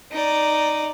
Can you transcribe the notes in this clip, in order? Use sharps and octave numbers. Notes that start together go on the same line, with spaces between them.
D#4 D5